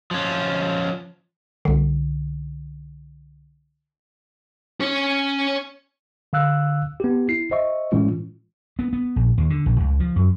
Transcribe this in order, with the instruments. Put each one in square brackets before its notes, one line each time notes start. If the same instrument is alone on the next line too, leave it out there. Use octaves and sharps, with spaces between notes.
[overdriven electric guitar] F3 C#4
[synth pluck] C2 D3
[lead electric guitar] C#4 C#5
[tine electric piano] D3 F5 E6 F#6
B3 G4
E4 C7
C5 D#5 E5 C#6
A2 E3 G#3 C#4 F4
[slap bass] B3
B3
A#1
D#2
D3
A#1
C#2
F3
F#2